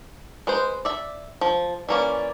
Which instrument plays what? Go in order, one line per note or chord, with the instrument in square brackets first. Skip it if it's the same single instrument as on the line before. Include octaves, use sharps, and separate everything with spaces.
[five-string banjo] G#3 B4 C5
D5 E5
F3
[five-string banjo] E3 A#3 C#4 [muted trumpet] D5